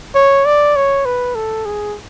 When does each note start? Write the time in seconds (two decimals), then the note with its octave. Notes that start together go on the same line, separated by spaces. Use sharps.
0.15 C#5
0.45 D5
0.76 C#5
1.05 B4
1.35 A4
1.65 G#4